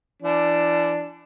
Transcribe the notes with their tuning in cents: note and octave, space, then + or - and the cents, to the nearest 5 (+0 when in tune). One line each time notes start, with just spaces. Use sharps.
E3 +35 D4 +0